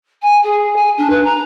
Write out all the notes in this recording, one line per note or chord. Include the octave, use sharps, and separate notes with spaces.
G#5
G#4
G#5
D4
B4
A#5